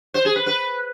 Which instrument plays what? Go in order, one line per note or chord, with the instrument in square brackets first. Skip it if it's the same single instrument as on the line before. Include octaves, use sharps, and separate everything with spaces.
[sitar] C5
G#4
B4
B4